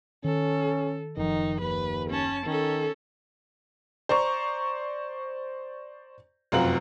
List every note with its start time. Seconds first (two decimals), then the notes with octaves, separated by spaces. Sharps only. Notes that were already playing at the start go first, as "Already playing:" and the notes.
0.24 D#3 C#4 A4
1.17 F#1 D#3 F3 D#4
1.61 D#2 B4
2.10 C#4 A5
2.46 D#3 C#4 A4
4.09 C5 D5 A#5 C#6
6.52 F1 F#2 C4 F4 F#4 F#7